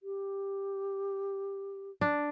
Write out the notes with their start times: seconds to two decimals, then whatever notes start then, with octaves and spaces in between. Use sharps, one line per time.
0.03 G4
2.01 D4